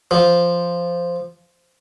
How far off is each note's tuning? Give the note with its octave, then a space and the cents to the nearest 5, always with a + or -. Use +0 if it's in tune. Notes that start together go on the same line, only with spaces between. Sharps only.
F3 -10